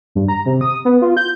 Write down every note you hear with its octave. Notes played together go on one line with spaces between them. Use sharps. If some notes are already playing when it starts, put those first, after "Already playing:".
G2
A#5
C3
D#6
B3
F4
G6